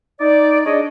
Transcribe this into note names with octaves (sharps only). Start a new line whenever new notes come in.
D#4 D5
D4 G#4 C#5 D#5